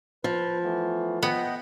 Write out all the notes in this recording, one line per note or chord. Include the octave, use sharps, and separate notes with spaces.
F3 B4
E3 A3 B3
B3 D#5 F#5 G5